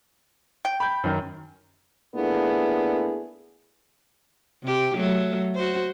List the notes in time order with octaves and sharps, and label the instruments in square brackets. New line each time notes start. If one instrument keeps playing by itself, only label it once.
[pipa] G5
[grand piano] B5 G6
F#2 D#3
[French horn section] A#2 A3 B3 D4 E4 G#4
[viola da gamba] C3 G4
F#3 A3
F#4 C5